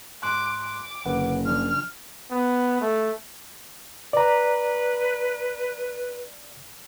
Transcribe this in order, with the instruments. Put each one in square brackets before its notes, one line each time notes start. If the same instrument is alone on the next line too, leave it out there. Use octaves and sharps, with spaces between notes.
[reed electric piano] G#2 C6 F#6 [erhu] D6
[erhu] D6
[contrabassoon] F#1 [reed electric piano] D3 B4 F#5
[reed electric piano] C#3 F3 D4 [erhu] F6
[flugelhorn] B3
A3
[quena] B4 [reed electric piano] D5 A#5